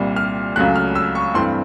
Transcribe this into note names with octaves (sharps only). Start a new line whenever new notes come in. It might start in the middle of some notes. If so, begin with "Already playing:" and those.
Already playing: C2 A#2 G3
F6
C#2 C#3 F#3 A3 F#6
F6
E6
C#6
G2 E3 A3 C4 C6